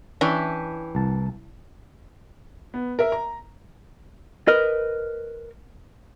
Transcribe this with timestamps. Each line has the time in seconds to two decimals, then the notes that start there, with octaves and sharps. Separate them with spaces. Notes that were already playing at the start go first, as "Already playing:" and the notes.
0.21 E3 C#4 D4 G4
0.95 C2 A5
2.74 B3
2.99 A#4 E5
3.12 A#5
4.48 A#4 B4 D#5